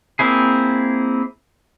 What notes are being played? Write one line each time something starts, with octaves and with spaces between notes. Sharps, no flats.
A#3 C4 E4 G#4